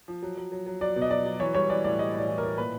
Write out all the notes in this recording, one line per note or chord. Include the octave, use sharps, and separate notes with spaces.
F3
F#3
F#3
F#3
F#3
F#3 D5
B2
D#5
F#3 D5
F#3
E3 C#5
G3 C#5
E3 D5
A2 D5
G3 D#5
A2 D5
E3
A2 A#4
A#2 B4